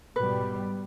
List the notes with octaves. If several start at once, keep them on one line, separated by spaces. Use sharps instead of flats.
G#2 B2 G3 B4